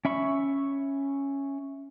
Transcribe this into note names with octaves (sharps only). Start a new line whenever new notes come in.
C#4 E5 B5 C#6